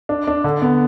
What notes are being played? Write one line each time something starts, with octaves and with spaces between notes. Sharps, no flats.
D4
D4
D3
B3